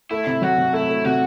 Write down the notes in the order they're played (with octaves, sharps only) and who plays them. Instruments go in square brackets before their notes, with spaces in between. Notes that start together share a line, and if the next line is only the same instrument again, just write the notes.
[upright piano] A3 [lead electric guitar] E4
[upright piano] C3
[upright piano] F#3 [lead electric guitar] F#4
[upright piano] C3
[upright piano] A3 [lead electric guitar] E4
[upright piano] A3
[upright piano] C3 [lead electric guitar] F#4